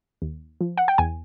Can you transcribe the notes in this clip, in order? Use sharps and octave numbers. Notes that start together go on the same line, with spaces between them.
D#2
F3
F#5
G5
E2 G#5